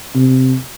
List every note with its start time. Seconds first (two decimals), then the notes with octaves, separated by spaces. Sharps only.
0.15 C3